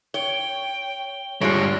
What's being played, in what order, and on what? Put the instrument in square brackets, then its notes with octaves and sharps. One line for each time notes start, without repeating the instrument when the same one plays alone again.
[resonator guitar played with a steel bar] C#5 [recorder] G5 [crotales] G7
[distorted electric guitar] G2 C#5 [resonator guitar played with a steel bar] D3 G3 G#3 [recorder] F4 [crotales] A#6 D7